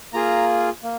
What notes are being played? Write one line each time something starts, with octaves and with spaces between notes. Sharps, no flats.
A#3 F4 G#4 A#5
A#3